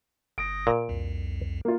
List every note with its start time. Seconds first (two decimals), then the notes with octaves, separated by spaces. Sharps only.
0.38 G1 D#6 A#6 D7
0.67 A#2
0.89 C2 F2
1.65 A#3 F4